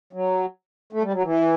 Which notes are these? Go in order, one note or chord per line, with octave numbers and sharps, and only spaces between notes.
F#3
A3
G3
F#3
E3